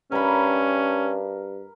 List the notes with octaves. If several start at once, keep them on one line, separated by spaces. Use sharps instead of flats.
G2 C#4 A#4 B5